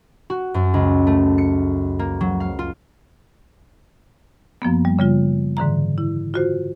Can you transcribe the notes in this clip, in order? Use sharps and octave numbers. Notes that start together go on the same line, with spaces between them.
F#4
F#2
C#2
A3
C#7
A#3
F#3
F5
F4
F#2 F3 A#3 B3
G3
C#3 G3 F4
G#2 D3 E3 A#5
E4
F4 F#4 C5